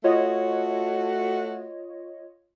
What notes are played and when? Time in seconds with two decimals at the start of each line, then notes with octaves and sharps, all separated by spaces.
0.04 A3 F4 F#4 C#5 D#5